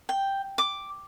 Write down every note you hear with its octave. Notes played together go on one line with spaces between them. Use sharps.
G5
D6